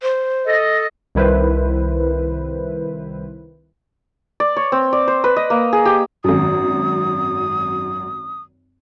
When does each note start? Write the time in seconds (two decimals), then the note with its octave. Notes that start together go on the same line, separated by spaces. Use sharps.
0.02 C5
0.47 A4 D#5
1.15 C2 D#3 E4 B4 C5
4.40 D5
4.57 C#5
4.72 C4
4.93 D5
5.08 C5
5.24 B4
5.36 D#5
5.50 A#3
5.73 G#4
5.85 G4
6.24 G#1 F#2 D#6